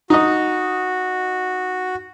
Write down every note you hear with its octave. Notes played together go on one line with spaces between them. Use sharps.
D#4 F#4 D#5